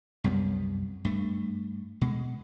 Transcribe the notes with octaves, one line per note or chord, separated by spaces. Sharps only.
C2 F#2 G3 B3
G2 A3
B2 G#3